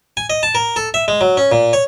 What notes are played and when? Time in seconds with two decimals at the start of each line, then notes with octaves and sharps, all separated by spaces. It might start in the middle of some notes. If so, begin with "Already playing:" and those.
0.17 G#5
0.30 D#5
0.43 A5
0.55 A#4
0.76 A4
0.94 E5
1.08 G#3
1.21 F#3
1.37 C#4
1.52 A#2
1.73 C#5